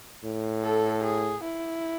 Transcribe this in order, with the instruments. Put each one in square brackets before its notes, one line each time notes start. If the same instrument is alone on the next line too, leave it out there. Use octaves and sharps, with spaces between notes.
[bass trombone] A2
[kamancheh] A4
G#4
E4